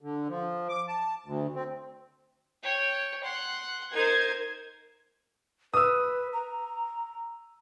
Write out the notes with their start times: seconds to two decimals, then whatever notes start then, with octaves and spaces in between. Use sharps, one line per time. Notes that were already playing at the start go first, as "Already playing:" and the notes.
0.01 D3
0.29 F3
0.69 D6
0.88 A5
1.26 D2
1.55 C4
2.63 C#5 G5
3.24 F#5 C6
3.94 D#4 A#4 C5 G#6
5.74 B4 D#6 E6
6.33 A#5